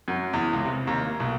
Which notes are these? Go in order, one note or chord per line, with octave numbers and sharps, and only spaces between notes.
F#2
E2
C#2
C3
D#2
A#3
B1